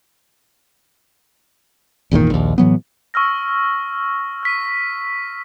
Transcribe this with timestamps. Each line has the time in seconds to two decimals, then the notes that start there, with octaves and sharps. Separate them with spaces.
2.11 G#1 E2 A#2 D#3
2.30 A#1 D#2
2.58 A2 E3 F#3 B3
3.14 C#6 E6 F6 A#6
4.43 F6 B6 D#7